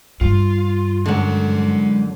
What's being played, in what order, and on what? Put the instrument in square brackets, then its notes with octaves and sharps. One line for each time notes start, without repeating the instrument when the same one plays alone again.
[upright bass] G2 [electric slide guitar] F4
[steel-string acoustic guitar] F#2 D3 [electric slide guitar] G#3 F#5